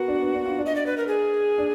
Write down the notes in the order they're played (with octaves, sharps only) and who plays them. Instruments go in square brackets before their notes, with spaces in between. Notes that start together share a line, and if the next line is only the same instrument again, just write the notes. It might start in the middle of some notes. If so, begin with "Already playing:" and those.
Already playing: [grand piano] B3 A#4 [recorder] F#4
[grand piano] D4
B3
D4
F4
D4
[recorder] D#5
D5
B4
A#4
G#4
[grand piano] D4